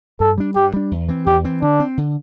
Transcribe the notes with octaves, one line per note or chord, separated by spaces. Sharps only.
G2 A4
G3 D4
G2 G4
G3 D4
E2
E3 C4
E2 G4
E3 C4
D3 D4
C4
D3